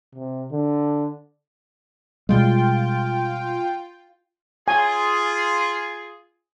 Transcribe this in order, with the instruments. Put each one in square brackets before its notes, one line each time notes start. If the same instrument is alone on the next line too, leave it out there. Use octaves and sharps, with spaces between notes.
[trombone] C3
D3
[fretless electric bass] B2 G3 G#3 [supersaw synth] F4 G5
[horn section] F4 G#4 [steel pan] G#5